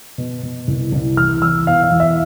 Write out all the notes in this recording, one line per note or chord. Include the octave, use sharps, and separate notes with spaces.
B2
B2
C2
C2
E2 F6
E2 E6
B2 F5
F5
E2
E5